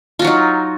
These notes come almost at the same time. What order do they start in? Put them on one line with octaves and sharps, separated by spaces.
F4 F#4 F#3 D#4